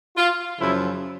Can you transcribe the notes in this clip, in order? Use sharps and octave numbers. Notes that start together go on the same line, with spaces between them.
F4
F#2 C#3 F3 E4